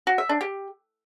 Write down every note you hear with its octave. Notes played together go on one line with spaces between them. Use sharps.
F#4
E5
D4
G4